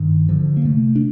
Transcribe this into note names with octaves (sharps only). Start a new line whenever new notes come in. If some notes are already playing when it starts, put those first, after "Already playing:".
Already playing: G2 D#3
D3 F3
A#3
C3 A3
D4